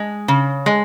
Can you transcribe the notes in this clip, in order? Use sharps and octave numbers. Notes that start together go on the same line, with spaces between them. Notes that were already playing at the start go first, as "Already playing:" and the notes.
Already playing: G#3
C#3
G#3